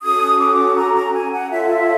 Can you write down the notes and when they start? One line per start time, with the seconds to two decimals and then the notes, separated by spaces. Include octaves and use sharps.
0.02 C#4 F#4 A4 D#6
0.39 D6
0.76 A#5
0.95 A#5
1.13 G#5
1.32 F#5
1.50 F4 A4 C#5 E5